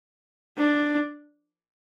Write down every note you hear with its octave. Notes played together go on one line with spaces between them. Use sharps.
D4